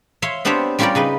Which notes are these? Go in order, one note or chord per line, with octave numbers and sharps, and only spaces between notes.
C#5 E5 F5 C6
B3 C4 D4 G4 C5 C#5
G3 C#4 F4 G4 A#4 D5
C#3 D#4 B4